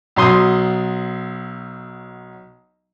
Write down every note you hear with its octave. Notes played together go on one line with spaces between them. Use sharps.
B1 F#3 C6 D#6